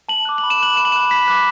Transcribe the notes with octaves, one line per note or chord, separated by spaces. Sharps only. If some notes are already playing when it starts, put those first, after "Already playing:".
A5 F#7
D6 F#6
F#7
B5
E7
D6 F#6 F#7
B5 E7
F#7
D6 F#6 E7
B5 B6
D6 F#6